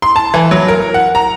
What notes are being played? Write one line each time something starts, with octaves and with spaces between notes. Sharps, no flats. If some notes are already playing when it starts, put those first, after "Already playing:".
C6
A5
E3
F#3
A#4
F#5
A#5